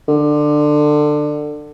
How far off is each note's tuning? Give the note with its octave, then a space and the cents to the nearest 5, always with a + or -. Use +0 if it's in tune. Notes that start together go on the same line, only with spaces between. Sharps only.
D3 +20